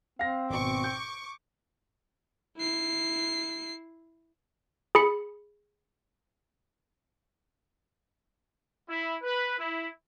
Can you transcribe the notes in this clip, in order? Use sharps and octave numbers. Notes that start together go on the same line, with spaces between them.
C4 F5 A#6
G#1 B2 C#6 D6
G6
E4 C7
G#4 B5 C#7
E4
B4
E4